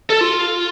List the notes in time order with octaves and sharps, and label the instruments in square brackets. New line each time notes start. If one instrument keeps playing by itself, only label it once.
[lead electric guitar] A4
F4